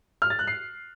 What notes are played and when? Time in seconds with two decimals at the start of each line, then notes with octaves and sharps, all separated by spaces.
0.22 F6
0.30 A6
0.39 F#6
0.47 C7